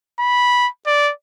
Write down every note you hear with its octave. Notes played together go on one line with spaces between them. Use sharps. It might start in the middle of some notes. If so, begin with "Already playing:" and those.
B5
D5